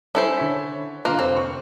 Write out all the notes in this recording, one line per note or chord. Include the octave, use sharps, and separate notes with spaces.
C#4 E4 A4 C5
D3 C#5 B6
D3 A#3 F4 F5 F#6
F1 C4 B4 C5
C#6